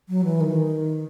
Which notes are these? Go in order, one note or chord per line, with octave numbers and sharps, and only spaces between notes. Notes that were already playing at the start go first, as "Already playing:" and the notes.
F#3
E3
D#3